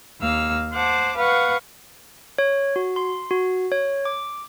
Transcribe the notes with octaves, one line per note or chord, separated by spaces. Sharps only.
D#2 A#3 F5 E6 F6
C5 F#5 A5 D6
B4 F5 F#5 C#6
C#5
F#4
C6
F#4
C#5
D6